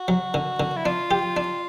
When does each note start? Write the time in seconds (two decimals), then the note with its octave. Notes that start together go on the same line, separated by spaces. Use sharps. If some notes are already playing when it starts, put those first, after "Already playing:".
Already playing: F#4
0.08 F#3
0.34 D3
0.60 D3
0.77 E4
0.85 D4 F4
1.11 G4
1.37 D4